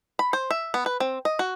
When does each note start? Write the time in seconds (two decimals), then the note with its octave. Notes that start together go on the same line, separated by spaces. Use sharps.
0.19 B5
0.33 C5
0.50 E5
0.74 B3
0.86 B4
1.00 C4
1.25 D#5
1.39 F#4